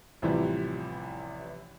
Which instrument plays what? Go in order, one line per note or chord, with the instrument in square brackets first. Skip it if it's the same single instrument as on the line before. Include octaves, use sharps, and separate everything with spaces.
[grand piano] A1 C3 E3 F3 G3